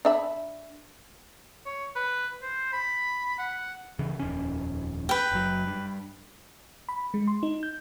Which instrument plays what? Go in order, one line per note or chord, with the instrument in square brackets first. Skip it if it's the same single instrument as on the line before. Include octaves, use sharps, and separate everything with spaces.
[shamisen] D4 E5 B5
[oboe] C#5
B4
C5
B5
F#5
[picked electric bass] C#3 E3
D#1 F2 C#4
[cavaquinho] B4 G5
[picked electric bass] F#1 F#3
G2
[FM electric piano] B5
G#3
C6
D#4
G6